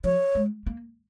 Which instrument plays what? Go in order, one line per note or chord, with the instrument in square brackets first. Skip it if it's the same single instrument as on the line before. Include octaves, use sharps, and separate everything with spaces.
[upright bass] F3 [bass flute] C#5
[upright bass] G#3
A#3